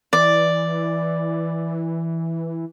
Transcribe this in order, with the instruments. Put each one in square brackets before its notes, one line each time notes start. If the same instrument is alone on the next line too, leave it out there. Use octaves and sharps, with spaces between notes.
[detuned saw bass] E3 [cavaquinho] D5